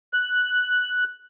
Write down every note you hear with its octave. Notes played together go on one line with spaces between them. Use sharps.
F#6